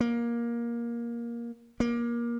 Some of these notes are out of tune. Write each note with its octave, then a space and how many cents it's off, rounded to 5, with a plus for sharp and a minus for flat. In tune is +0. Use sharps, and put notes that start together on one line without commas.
A#3 +15
A#3 +25